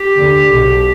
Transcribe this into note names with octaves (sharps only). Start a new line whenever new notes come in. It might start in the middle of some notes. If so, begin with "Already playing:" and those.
Already playing: G4
D2 D3
B1 B2